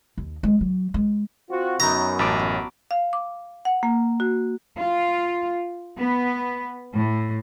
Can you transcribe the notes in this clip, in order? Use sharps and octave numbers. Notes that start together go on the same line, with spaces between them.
D#2
G#3
F#3
G#3
C4 F4 F#4
F#2 F#3 B3 D#4 A#5
A1 A5 B5 D6
F5
D6
F#5
A#3
F#4
F4
B3
A2